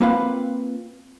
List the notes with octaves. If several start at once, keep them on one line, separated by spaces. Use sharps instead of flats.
A#3 C4 F4 B4 F5 F#5